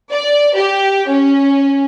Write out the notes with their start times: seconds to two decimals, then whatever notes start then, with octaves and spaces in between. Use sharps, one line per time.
0.11 D5
0.54 G4
1.08 C#4